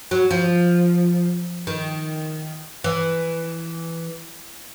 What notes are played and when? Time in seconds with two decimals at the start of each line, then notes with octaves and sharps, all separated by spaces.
0.11 F#3
0.31 F3
1.67 D#3
2.84 E3